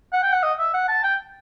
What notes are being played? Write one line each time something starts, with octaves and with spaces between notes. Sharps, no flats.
F#5
G5
F#5
D#5
E5
F#5
A5
G5